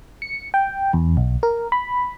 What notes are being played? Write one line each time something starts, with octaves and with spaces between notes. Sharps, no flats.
C#7
G5
E2
B1
A#4
B5